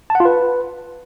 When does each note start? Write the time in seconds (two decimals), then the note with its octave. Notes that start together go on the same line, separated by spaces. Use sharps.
0.10 A5
0.15 F#5
0.20 F4
0.25 B4